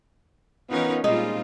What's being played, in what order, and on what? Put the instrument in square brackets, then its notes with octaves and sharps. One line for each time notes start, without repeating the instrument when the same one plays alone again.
[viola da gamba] E3 C#4 F4 [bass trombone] B3 [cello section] D#4 A#4 B4
[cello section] A#2 C4 F4 [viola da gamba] G3 [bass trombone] G#3 [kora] D#4